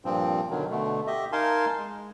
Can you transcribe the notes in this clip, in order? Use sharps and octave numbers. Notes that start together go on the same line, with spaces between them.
G2 A#2 F3 C4
B2 D3 D#3 F#3
B2 D3 A3
G4 D#5 E5
D#4 A#4 F5 G#5 A5 C6
G#3